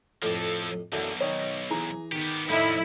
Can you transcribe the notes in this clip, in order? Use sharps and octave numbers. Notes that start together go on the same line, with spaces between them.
F2 A2 F3 A4 D6
B1 F#2 D3 E3
D#3 C#5 D#5
E3 G#4 A#5
D#3 B3 G4
F2 A2 F3 D#4 E4 D5